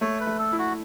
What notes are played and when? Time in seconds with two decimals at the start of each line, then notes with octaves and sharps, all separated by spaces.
0.01 A3 C#5
0.20 B4
0.27 A3
0.39 A4
0.52 E4
0.59 F#4